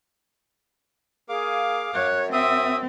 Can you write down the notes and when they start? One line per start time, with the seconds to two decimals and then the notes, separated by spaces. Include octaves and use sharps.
1.29 A#3 G#4 F5 D6
1.94 F#2 C#5 F#6
2.33 C4 E5 D#6 E6